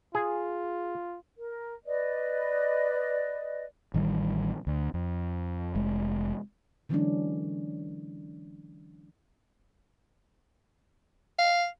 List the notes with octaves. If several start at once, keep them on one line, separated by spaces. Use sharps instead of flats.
F4 G#4
A#4
B4 D5 D#5
A1 D#3 G3
D2
F2
F1 G#3
D3 E3 F#3 G#3 C#4 D4
F5